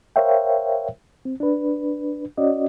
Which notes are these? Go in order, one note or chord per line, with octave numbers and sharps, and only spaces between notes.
A#4 C5 C#5 E5 F5 G5
C4
D4 B4
C#4 F#4 D5 D#5